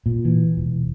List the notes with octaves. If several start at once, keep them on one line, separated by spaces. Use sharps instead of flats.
A#2
E3
E1